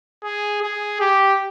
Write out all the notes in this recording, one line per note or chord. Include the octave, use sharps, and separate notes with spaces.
G#4
G#4
G4